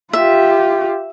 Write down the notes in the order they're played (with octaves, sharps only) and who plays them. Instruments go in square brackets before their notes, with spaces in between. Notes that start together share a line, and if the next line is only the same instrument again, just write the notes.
[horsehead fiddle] F4 G4 [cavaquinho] E5